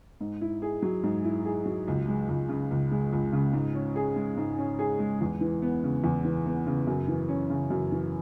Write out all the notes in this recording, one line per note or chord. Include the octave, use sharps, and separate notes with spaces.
G#2
E4
G#4
F#3
G#2
E4
G#4
F#3
C#2
G#3
C#2
C#3
C#2
G#3
C#2
C#3
G#2
C#4
G#4
G#3
G#2
C#4
G#4
G#3
E2
E3
B3
C#3
E2
E3
B3
C#3
F#2
E3
C#4
C#3
F#2
E3